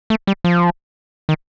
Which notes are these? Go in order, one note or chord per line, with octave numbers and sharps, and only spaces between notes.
A3
G3
F3
D#3